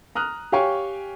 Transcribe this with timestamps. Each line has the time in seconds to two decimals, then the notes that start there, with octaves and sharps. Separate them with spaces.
0.15 A#5 D#6 F6 F#6
0.52 G4 C#5 F5 G5 G#5 C#6